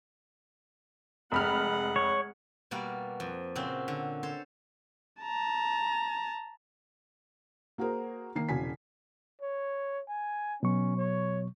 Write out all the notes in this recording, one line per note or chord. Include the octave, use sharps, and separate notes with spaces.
F1 G#3 F#5 B5 F6
C#5
B2 G3 A#3 F#4 D5 F#5
F2
A#2 C#3 C4 F#4
D3
A4 C5 C#5
A5 A#5
A#3 F#4 G#4 A#4 C5
D#3 A#3 C7
E1 C#3 F#4 G#5 B6
C#5
G#5
B2 F#3 C#4 C#6
C#5